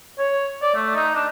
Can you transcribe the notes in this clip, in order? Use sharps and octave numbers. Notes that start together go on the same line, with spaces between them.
C#5
D5
A3
D#4
D4